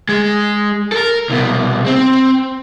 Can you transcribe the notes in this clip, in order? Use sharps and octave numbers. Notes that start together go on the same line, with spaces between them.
G#3
A4 A#4
C2 B2
C4